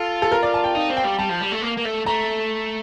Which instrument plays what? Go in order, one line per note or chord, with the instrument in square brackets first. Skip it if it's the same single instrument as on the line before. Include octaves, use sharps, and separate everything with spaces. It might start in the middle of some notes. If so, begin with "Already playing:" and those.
Already playing: [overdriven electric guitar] F4 [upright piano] A4
[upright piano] A4
A#4
D5
A5
G5
[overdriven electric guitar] D#4 [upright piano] F5
[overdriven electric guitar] C4
[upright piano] G5
[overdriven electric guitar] G3
[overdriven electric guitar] G3 [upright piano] A5
[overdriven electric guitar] F3
G3
A3
A#3
A#3
A3
[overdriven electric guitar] A3 [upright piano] A#5